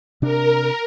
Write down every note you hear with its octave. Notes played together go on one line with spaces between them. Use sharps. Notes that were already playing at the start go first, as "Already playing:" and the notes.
C3 D4 A#4